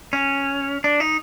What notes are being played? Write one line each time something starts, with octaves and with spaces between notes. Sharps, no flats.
C#4
D4
D#4